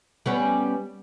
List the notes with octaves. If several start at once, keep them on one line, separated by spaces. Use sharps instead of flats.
G3 B3 C#4